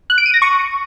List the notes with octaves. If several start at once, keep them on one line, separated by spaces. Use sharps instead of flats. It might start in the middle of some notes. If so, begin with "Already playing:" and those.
F#6
D7
D#7
A#6
C#6